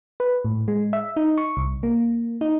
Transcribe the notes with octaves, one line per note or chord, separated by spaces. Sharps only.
B4
A2
G#3
E5
D#4
C#6
C2
A#3
D#4